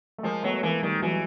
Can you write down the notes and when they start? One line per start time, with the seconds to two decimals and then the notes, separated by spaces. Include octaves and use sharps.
0.18 A3
0.23 F3 G#3 A#3
0.43 F#3 A3 B3
0.63 E3 G#3 A#3
0.83 D#3 G3 A3
1.02 E3 F#3 G#3